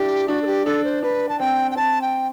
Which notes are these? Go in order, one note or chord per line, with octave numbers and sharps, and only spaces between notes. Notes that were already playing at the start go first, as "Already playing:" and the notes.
Already playing: D4 E4 G4
D4 F#4
A4
G4
D4 A4
C5
D4 B4
A5
C4 G5
G5
C4 A5
G5